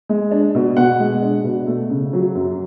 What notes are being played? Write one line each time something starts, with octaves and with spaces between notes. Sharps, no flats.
G#3
D4
B2
B2 F#5
G#3
D4
B2
A3
C#3
F#3
F#2